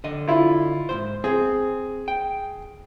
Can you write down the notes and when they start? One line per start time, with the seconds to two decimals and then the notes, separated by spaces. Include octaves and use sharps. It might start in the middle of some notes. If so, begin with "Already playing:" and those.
0.04 D3 D#5
0.28 E4 F4
0.89 G#2 C3 C5
1.24 C4 G#4
2.08 G5